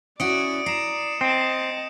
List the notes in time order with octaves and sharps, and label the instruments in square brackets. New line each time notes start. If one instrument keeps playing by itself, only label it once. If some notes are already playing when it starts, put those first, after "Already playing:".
[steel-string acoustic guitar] C#4 E4 F#4 [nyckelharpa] D5 [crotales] D#6 C#7 D7
[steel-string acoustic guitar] A#5 [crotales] C7 E7
[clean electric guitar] C4 [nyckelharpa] D#5 A5 [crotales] D#6